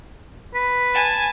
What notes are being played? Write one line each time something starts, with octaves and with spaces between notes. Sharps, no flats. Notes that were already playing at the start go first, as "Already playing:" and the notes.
B4
G#5 A5